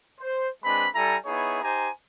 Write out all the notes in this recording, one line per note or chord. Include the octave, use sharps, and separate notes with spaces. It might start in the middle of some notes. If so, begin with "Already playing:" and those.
C5
G#3 C4 D4 B4 B5
G3 E4 A4 G#5 A#5
B3 D#4 E4 G#4 C#5
D#4 G4 C5 G#5 A#5